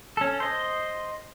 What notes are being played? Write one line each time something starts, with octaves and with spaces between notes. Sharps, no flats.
C#4 A4
C5 D#5